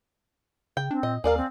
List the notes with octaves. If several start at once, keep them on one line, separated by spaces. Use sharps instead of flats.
C#3 G5
C4 D4
A#2 D#5
D#2 G#4 A#4 D5 F5
C4